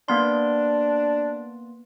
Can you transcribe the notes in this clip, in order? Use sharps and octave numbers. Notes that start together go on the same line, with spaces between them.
A#3 B3 D4 C6